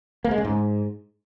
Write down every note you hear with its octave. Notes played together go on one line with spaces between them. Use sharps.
A#3
G#3
C#3
G#2